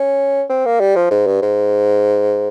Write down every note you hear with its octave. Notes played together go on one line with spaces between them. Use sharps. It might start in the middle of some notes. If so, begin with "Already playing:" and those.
Already playing: C#4
C4
A#3
G3
F3
G#2
G2
G#2